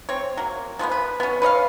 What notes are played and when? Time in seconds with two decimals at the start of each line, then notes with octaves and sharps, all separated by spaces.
0.09 C4 C#5
0.37 F#3 A#3
0.79 F3 G#3 A#3 B3
0.91 B4
1.20 B3 C#4
1.42 B4 C#5 D#5 F5